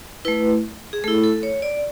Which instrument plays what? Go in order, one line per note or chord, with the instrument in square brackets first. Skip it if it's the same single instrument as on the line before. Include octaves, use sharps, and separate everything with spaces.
[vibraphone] A3 E4 B4
G#4
A3 E4 A4
A4
C#5
D5